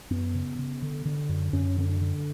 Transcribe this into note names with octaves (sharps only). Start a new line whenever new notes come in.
F#2 B3
C#3
C#3
D3
D3
F#2
F#2 C#4
D3 C#4
D4
D3